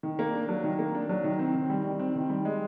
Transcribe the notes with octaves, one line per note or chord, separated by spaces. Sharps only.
D#3
A#3
D4
F#3
D#3
A#3
D4
F#3
D#3
C4
D#3
G3
D#3
C4
D#3
G3
G#3